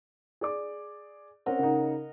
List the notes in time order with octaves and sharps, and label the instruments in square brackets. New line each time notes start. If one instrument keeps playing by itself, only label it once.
[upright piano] G#4 D5 D6
[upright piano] C4 C#4 [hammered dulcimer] A#4 D#5 F#5
[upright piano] C#3 D#4